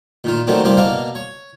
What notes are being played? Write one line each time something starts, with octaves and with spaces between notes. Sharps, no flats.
A#2 D#3 F4
D#3 F#3 A3 A#3 C4 D4
C2 G2 A#3 C4 D5 F5
B2 A#3 D4 F5
C#5